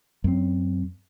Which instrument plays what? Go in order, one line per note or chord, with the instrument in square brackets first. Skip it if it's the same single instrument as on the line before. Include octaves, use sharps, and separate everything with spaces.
[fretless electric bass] F#2 C4